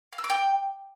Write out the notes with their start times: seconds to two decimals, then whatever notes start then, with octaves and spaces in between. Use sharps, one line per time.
0.13 F5
0.18 E6
0.24 D6
0.30 G5